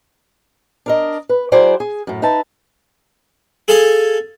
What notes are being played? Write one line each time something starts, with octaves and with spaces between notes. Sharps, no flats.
D4 A#4 D#5
B4
F#3 E4 G#4 C5 D5 G5
G#4
F#2 A2
D#4 B4 E5 A5
G#4 A4 F5 G#5 A5